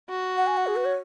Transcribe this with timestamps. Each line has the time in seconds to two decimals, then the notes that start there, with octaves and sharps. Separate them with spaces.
0.09 F#4
0.37 F#5
0.47 G#5
0.57 F#5
0.67 G#4
0.76 B4
0.85 C#5